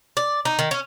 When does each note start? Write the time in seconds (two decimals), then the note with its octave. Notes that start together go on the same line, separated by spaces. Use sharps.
0.17 D5
0.45 D#4
0.59 D#3
0.71 C#4